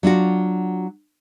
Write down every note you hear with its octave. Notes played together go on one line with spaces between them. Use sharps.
F#3 D4 F4 F#4